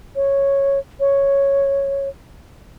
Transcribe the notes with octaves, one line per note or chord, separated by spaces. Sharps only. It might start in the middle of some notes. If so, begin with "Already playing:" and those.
C#5
C#5